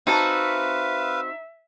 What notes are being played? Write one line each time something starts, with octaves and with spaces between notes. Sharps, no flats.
C4 D#4 F#4 B4 E5 F5 A5